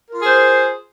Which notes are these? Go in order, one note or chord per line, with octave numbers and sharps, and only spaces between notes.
F4 G#4 A#4 C5